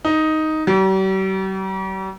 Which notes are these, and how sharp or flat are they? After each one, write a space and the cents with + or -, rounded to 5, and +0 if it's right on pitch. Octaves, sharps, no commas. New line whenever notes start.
D#4 +5
G3 -45